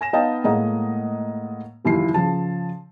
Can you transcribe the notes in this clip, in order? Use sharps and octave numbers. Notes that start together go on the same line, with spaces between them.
G#5 A#6 E7
B3 D#4 D#5 F5 G5 A5
A2 G#3 A#3 D#5 F#5 A#5
F#1 D#2 E3 E4 F4 C7
C#3 F3 A5